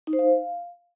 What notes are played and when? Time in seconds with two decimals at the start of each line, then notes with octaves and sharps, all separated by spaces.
0.07 D#4
0.13 C5
0.19 F5